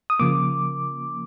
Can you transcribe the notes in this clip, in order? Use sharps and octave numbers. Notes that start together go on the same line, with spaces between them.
D#6
C#3 F3 A#3 D6